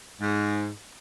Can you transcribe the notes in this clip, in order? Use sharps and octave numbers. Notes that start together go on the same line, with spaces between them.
G#2